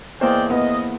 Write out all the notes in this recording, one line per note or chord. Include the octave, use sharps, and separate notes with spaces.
E2 A#3 C5 D5 D#5 G5 E6
B3 D#5